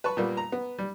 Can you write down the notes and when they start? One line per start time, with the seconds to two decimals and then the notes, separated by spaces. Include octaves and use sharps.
0.04 B4 A5 B5 C#6
0.17 A#2 G3 A#3 B3
0.37 A#5
0.52 B3
0.79 G3